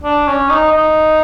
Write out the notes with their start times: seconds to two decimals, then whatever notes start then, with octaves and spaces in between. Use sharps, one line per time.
0.04 D4
0.27 C#4
0.50 D#4
0.73 D#4